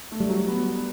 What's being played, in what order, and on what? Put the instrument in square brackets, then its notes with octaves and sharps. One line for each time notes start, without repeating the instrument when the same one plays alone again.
[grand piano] A3
[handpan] G3
[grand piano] F#3
B3
B3